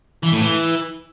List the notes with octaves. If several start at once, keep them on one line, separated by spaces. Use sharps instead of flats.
E3
A2
E3